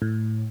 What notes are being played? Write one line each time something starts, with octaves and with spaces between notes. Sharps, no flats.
A2